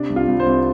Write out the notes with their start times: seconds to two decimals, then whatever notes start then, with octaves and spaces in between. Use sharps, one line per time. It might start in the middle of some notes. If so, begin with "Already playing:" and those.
Already playing: C3 D4
0.10 C2
0.16 F4
0.28 C2
0.40 C5
0.46 C2